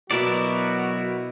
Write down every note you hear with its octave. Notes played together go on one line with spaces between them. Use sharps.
B2 F#3 B3 E4 F#4 A#4 D5 A5